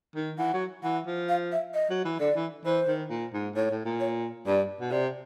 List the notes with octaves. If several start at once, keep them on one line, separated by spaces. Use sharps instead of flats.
D#3
E3 F#5
F#3
E3 F#5
F3
F5
E5
D#5
F#3
E3
D3 D5
E3
E3 C5
D#3
A#2
G#2
A2 C#5
A2
A#2
C#5
G2 D5
B2
C3 D5